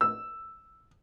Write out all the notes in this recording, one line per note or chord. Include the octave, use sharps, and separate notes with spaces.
E6